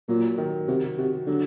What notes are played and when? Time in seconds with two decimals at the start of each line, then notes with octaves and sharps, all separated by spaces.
0.08 A#2 F#3
0.38 D#3
0.68 C3 F#4
0.98 C3 F#4
1.27 D3 F#3